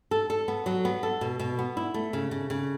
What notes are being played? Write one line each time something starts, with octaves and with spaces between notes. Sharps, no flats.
A4
A4
B3
F#3
B3
A4
B2
B2
B3
E4
A3
C#3
C#3
C#3